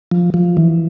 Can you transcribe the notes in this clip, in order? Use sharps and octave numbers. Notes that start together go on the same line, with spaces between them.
F3
F3
E3